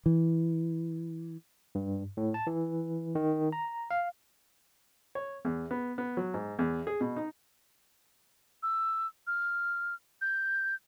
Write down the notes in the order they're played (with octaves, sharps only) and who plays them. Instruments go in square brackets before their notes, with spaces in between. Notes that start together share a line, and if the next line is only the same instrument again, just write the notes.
[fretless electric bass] E3
[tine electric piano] G2
A2
A5
E3
D#3
A#5
F5
[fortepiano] C#5
E2
B3
B3
F#3
G#2
E2
G#4
B2
D#4
[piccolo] E6
F6
G6